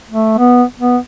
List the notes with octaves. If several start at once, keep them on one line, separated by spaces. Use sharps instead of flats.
A3
B3
B3